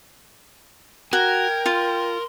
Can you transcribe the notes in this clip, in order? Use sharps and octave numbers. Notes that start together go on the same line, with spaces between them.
F#4 A#4 G5 G#6
F4 C6